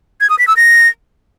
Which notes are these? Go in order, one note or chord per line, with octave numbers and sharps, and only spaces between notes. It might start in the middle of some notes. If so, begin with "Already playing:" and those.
G#6
D#6
B6
E6
A#6